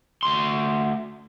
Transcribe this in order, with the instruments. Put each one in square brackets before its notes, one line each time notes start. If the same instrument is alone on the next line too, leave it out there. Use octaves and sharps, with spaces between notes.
[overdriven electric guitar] D2 C6